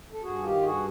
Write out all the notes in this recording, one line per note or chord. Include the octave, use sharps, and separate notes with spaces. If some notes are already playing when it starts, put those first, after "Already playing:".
A4
G2 F#4 G#4
D#3 F4 G4
G2 F#4 G#4